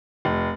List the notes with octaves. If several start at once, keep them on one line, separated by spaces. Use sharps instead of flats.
F1